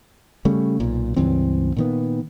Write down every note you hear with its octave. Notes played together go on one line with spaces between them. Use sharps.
C#3 G3 A3 C#4
B1 A#2
C#2 G2 E3 C4
A#2 D#3 B3